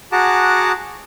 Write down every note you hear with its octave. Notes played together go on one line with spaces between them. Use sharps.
F#4 G#4 F#5 A5 A#5 D6